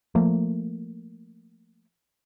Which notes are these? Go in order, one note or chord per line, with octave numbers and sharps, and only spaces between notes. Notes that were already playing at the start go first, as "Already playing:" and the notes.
F3 A3 A#3